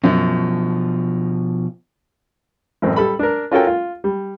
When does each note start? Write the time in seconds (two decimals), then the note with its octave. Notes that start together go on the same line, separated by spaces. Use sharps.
0.04 F#2 B2 F3
2.82 A1 F#2 C4
2.96 G3 A4 B5
3.19 D4 A#4
3.51 C#4 F4 F#4 A4 A#4 G5
3.67 F4
4.04 G3